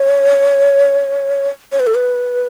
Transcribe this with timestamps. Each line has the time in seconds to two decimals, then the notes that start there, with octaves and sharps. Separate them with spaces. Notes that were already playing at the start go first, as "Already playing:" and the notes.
Already playing: C#5
1.72 C#5
1.80 B4
1.87 A4
1.95 B4